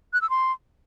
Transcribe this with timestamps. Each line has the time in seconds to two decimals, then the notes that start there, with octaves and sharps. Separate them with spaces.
0.13 F#6
0.21 E6
0.30 C6